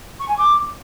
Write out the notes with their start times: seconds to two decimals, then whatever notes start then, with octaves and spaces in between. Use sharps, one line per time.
0.19 C#6
0.28 G#5
0.37 D6